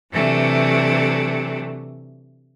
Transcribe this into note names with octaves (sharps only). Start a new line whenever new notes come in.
C3 E3 F#3 A3 D4